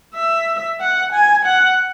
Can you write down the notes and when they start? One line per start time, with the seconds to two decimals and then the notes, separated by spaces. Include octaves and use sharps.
0.14 E5
0.80 F#5
1.12 G#5
1.45 F#5